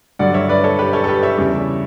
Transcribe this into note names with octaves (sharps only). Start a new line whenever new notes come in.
G2 D3 F#3 D5 F#5
C#5 E5
B4 D5
A4 C#5
G4 B4
A4 C#5
A4
G4 B4
C#5 E5
E2 C#3 G3